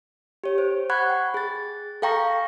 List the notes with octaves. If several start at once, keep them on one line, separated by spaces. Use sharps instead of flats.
G4 C#5
C5
F#5 B5 C#6 F#6 G#6
G5
G#4 A6
A4 F5 G5 A#5 C#6 A#6